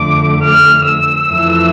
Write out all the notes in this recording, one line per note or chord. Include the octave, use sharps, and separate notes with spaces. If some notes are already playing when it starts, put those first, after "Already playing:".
Already playing: F2 D3 A3 D6
F6
E6
F2 E3 A3